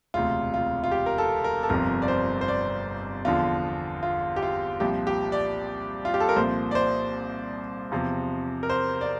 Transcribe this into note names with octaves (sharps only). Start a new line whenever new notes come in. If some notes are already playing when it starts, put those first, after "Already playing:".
E1 D2 C3 F4
F4
F4
G4
A#4
A4
A#4
A4
G1 F2 C3 F3 A#4
D5
C5
C5
D5
E2 D3 F3 F4
F4
G4
F4
C2 A#2 F3 G4
G4
D5
F4
G4
A4
A#4
C2 A#2 F3 C5
D5
C5
E2 C3 F3
A#4
C5
D5